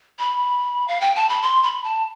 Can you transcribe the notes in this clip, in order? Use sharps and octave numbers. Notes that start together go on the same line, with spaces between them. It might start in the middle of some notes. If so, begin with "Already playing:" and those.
B5
F5
G5
A5
B5
C6
B5
A5